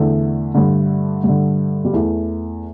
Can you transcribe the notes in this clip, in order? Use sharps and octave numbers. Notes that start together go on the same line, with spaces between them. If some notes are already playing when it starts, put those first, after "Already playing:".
Already playing: E2 D3 A3
G2 D3
G2 D3
G3
E2 E3 A3